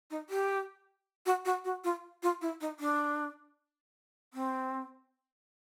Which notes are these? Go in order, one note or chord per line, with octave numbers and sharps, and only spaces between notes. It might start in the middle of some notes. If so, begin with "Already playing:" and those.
D#4
G4
F#4
F#4
F#4
F4
F4
E4
D#4
D4
C4